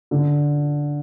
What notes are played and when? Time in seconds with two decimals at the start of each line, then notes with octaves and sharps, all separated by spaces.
0.11 D3